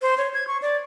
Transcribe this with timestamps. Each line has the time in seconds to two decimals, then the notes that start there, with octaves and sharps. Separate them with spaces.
0.02 C5
0.18 C#5
0.34 G#6
0.47 C#6
0.62 D5